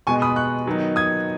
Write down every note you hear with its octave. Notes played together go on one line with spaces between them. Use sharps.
B2 G#3 B3 G#5 C#6
B5 D#6
C#6 F#6
D#3 F#3 B3 D#4
D#6 G#6